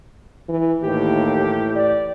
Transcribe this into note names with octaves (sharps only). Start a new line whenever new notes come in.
E3
D#2 A2 E3 G4
D5